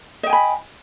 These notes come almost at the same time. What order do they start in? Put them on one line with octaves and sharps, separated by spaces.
D#5 G5 G#5 B5